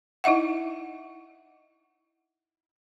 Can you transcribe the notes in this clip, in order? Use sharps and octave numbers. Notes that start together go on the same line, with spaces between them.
D#4 E4 D#5 E5 F#5